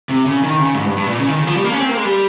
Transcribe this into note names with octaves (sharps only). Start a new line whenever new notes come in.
C3
C#3
D#3
C#3
G#2
G2
G2
A#2
C#3
D#3
C#3
F3
G3
A#3
C#4
C4
A#3
G#3
G3